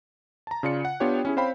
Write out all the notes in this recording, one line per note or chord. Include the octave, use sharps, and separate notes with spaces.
A5 A#5
C#3 F4 D5 C#7
F#5
B3 D4 F4 G4 C#5 G5
C#4 E4 G#4
C4 C5 C#5 F5 G5 B5